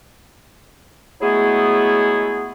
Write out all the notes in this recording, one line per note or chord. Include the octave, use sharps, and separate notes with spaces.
F#3 G#3 A3 B3 E4 G#4